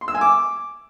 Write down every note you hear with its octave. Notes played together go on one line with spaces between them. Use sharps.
C6
E6
G#5
D6